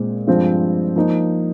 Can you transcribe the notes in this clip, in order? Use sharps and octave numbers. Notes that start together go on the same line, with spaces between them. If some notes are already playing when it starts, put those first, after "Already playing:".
Already playing: A#2 G#3 C4
G2 F3 G#3 C4 F4
F3 A#3 D#4